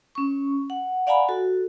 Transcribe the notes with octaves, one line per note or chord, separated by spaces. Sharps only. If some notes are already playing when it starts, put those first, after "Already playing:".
C#4 C#6
F#5
D5 F5 F#5 G#5 A#5 B5
F#4 A4